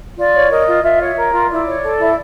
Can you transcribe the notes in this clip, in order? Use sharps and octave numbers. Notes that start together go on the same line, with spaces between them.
F4 D5
C#5
A#4 D#5
F4
F4 E5
C#5
E5
A#4
F4
E4 D5
C#5
A4
E4